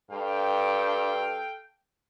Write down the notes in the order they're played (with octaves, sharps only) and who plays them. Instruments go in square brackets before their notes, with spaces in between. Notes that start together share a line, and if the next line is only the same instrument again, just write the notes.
[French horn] G2 [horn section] A4 F5 G5